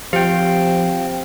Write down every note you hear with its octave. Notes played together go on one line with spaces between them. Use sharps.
F3 C4 G4 F5 G5